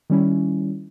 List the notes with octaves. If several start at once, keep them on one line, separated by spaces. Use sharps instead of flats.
D#3 G3 C#4 E4